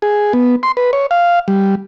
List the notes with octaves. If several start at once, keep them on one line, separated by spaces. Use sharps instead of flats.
G#4
B3
C6
B4
C#5
F5
G3